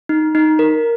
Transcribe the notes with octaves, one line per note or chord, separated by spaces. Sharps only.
D#4
D#4
A#4